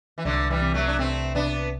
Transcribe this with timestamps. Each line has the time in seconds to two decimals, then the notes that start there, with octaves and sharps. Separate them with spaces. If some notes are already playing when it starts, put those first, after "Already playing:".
0.18 E3
0.25 C2 D3 F#3
0.50 E3 G3
0.62 C3
0.74 F#3 A3
0.87 D4
0.98 C3 A3 C4
1.35 C3 B3 D4